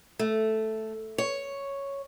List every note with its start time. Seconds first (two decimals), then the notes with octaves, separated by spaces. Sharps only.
0.19 A3
1.18 C#5